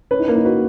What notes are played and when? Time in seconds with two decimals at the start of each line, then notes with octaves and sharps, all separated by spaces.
0.11 C#4 B4
0.19 D#4
0.28 A#3 C#4
0.36 D#4
0.44 F#4 B4